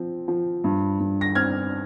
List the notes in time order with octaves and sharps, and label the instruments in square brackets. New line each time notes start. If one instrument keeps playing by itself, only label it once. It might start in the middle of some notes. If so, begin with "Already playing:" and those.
Already playing: [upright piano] F3 C4
F3
G2
G2
A#6
C4 F6 G#6